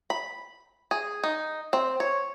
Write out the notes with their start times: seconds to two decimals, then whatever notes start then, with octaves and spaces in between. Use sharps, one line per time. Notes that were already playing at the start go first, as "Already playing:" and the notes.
0.10 B5
0.91 G#4
1.23 D#4
1.73 C4
2.00 C#5